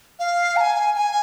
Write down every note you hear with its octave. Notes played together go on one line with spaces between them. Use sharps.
F5
A#5
G#5
G#5